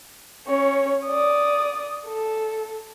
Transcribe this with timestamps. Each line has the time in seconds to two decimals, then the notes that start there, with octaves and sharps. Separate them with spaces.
0.48 C#4 C#5
1.06 D5 D#6
2.06 A4